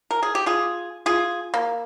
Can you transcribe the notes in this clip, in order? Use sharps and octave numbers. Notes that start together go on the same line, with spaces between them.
A#4
G#4
G4
F4 G#4
F4 G#4
A#3